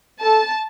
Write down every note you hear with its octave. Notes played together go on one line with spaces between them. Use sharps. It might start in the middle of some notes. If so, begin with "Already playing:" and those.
A4 A5